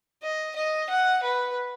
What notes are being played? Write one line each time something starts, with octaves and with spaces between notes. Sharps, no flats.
D#5
D#5
F#5
B4